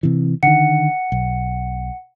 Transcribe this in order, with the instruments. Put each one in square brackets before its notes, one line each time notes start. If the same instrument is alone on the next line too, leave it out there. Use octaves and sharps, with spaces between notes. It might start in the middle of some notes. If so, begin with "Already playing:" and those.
[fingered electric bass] C3 E3
[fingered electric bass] D3 D#3 [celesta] F#5 C#7
[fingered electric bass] B1